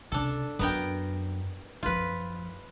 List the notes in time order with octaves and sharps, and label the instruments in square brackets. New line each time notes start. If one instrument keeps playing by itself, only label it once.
[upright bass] C#2 C3 [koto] D4 A4
[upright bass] F#2 D4 [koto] B3 A#4 G5
[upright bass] F#2 F3 [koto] F4 B4